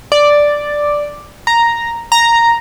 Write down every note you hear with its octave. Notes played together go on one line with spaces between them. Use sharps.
D5
A#5
A#5